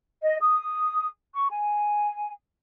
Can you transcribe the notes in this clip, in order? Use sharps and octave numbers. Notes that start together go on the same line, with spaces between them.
D#5
D#6
C#6
G#5